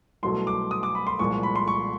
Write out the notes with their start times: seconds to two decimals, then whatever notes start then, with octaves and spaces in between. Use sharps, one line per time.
0.23 C2 B2 F#3 A3 C6
0.47 D6
0.71 D#6
0.83 D6
0.95 B5
1.07 C6
1.19 C2 A#2 F3 G#3 C#6
1.43 B5
1.56 C6
1.68 C#6